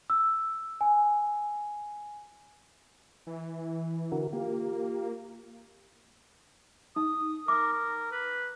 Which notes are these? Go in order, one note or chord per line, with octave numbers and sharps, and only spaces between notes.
E6
G#5
E3
D3 F#4 A#4
A#3 F4 G4
D#4 D#6
A#4 D6
A#4
B4